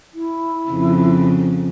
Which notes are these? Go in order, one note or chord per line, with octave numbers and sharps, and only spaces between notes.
E4
F2 C#3